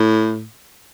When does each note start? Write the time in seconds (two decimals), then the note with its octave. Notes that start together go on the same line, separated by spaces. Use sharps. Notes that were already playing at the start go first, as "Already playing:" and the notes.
Already playing: A2